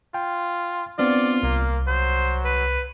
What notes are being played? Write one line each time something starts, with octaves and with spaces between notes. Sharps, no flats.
F4 G5
B3 C4 D4 F4 D5
C2 A#3
F#3 C5
B4